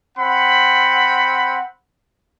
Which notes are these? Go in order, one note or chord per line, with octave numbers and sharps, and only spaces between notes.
C4 F#5 B5